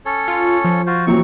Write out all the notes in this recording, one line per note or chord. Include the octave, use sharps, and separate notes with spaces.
C#4 A4 C#5
F4
F3
F4 F#4 C5
A#2 E3 F#3 C4 C#6